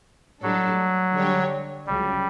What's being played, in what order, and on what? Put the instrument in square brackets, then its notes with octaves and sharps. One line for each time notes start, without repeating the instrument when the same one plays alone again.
[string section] A2 G3 D4 A4 [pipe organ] F#3
[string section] D3 G3 D4 G4 C#5
[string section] C#2 C#3 F#3 [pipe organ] G3